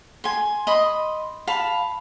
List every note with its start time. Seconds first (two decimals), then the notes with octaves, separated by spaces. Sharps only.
0.24 G#5 C6
0.67 D#5 B5 C6
1.47 F5 A5 B5